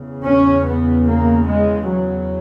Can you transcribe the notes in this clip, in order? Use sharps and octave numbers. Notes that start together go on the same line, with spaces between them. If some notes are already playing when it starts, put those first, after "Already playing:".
Already playing: E2 C#3
C#4
B3
A#3
G#3
F#3